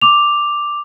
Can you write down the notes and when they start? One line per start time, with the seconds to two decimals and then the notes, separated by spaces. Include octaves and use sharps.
0.01 D6 F7